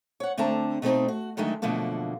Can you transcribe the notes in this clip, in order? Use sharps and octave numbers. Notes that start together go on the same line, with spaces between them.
C#5 F#5
D3 A3 C4 D4 A5 A#5
B2 A3 C4 D#4
F#4
D3 D#3 F#3 G#3 A3
F#2 B2 D3 F3 A3 A#3